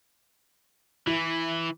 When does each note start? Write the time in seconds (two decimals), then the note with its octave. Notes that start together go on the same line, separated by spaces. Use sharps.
1.07 E3 E4